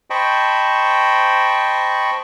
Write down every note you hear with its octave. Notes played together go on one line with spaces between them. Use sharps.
C5 D#5 G5 A5 B5 C#6